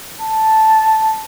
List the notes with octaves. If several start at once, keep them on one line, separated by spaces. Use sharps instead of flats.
A5